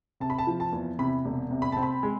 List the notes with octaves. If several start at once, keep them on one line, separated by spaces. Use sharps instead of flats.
C3 A5
B5
A5
F3
A5
E2
C3 B5
E1
C3
B5
C4 A5
B5
G#3